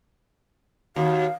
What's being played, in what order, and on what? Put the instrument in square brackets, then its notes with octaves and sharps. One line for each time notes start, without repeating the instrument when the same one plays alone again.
[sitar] D#2 [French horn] F#4 [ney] F5